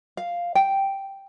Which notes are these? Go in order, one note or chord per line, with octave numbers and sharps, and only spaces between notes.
F5
G5